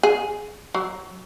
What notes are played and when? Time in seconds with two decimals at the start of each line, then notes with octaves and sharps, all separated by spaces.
0.03 G#4
0.75 F#3